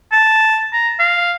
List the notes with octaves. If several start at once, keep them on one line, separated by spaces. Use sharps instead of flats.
A5
A#5
F5